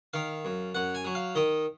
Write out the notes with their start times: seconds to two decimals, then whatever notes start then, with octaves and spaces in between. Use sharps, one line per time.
0.14 D#3 F5
0.45 F#2
0.75 F#2 F#5
0.95 G#5
1.05 F#3
1.15 F5
1.35 D#3 D#5